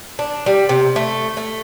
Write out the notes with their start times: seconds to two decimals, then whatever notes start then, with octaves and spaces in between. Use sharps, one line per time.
0.19 D4
0.46 G3
0.69 C3
0.96 A3
1.37 A3